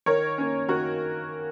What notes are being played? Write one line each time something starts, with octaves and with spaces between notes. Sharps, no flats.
D#3 A#4 C#5
A#3 C#4
D#3 F#4 A#4